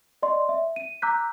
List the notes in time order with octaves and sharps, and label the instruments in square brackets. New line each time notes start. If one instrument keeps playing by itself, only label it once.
[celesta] D5 D#5 C6
E5
D#7
A#5 D6 E6 F#6 G6 B6